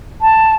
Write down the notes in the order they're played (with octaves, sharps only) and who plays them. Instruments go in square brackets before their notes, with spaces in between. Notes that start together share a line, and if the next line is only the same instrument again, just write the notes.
[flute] A5